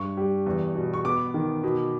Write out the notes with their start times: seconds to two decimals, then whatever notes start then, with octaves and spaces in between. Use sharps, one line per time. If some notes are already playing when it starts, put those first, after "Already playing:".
Already playing: G2 C#6
0.17 G3
0.46 E2
0.75 B2
0.94 C#6
1.05 B3 D6
1.34 D#3
1.63 B2